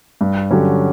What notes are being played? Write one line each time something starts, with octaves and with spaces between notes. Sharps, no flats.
G2
D3 F#3 C#4 G4